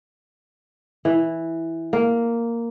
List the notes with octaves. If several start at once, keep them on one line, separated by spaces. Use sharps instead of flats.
E3
A#3